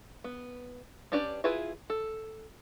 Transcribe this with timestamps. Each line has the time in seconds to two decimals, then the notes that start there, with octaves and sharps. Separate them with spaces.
0.24 B3
1.12 C#4 D4 G4 B4 D5
1.44 E4 F4 G#4 B4 E5
1.90 A4